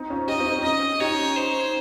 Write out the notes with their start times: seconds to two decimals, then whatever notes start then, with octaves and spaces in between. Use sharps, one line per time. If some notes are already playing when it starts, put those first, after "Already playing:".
Already playing: C4 D#4
0.10 C#4 F4
0.28 D#4 G4 D#5
0.40 C4 D#4
0.52 C4
0.64 C#4 D#5
1.00 D#4 G4 C#5
1.36 C5